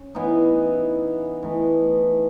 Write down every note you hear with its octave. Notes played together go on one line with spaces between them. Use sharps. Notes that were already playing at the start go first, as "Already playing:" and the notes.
Already playing: C#4
E3 B3 D#4
E3 A3 D#4